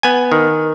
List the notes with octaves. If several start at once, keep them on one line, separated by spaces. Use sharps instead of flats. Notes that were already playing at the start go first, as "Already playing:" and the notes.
B3 G#5
D#3